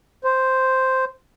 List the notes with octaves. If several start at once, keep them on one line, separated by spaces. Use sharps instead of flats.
C5